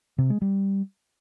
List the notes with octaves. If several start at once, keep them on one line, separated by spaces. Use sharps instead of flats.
C3
G#3
G3